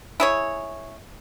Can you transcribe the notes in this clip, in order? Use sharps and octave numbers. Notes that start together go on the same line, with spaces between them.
E4 G#4 C#5